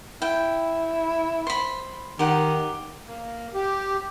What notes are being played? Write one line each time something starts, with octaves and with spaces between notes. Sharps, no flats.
E4 G5
C5 B5
D#3 G4 F#5
A#3
G4